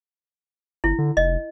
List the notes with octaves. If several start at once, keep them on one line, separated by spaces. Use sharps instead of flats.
G1 E4
D3
F1 D#5